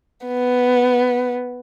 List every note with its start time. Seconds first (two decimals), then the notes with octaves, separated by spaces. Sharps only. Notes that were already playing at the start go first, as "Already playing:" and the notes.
0.27 B3